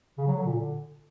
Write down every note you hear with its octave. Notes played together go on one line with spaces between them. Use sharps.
C#3
F#3
D3
A#2
D3